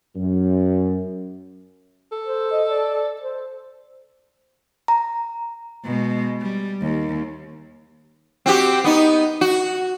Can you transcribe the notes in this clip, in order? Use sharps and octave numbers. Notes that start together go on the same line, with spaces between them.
F#2
A4
C5
D#5
D5
C5
A#5
B2 G#3
G3
D#2
C4 F#4 G4
B3 D#4
F#4